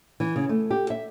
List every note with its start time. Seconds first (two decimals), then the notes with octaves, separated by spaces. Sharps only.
0.20 E3
0.36 C#3
0.49 A3
0.71 G4
0.90 E5